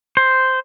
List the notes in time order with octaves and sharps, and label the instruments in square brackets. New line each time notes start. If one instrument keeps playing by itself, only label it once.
[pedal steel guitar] C5